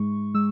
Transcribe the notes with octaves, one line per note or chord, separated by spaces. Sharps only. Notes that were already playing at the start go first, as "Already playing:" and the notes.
Already playing: G#2 G#3 C#6
G#3 E6